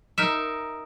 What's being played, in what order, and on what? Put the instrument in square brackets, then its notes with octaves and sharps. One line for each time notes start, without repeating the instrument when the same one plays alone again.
[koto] D#4 A#4 E5